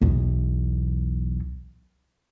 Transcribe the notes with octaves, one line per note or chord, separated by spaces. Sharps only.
B1 E2